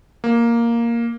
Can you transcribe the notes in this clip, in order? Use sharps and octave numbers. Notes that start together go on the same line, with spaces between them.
A#3